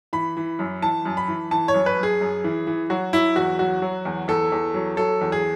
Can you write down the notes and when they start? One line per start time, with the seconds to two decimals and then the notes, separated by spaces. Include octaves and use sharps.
0.13 E3 B5
0.37 E3
0.59 F#2
0.82 E3 A5
1.05 F#2
1.17 B5
1.28 E3
1.51 E3 A5
1.68 C#5
1.74 F#2
1.86 B4
1.98 F#2
2.03 G#4
2.21 F#2
2.44 E3
2.67 E3
2.90 F#3 F#4
3.13 F#3 E4
3.36 E2 F#4
3.59 F#3 F#4
3.82 F#3
4.05 E2
4.28 E2 A4
4.52 E2
4.74 F#3
4.97 F#3 A4
5.21 E2
5.32 G#4